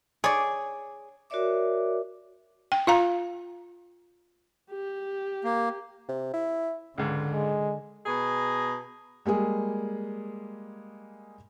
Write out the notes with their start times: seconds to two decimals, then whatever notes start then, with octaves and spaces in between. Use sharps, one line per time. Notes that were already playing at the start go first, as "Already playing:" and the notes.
0.24 G#4 C#5 D5
1.30 F#4 A#4 C#5 D5 E5 D6
2.72 G5
2.87 F4 F5 A#5
4.71 G4
5.44 A#3
6.08 C3
6.33 E4
6.98 C#2 G#2 D3
7.33 G#3
8.06 B2 G#4 A#5
9.26 G3 G#3 A#3 G#4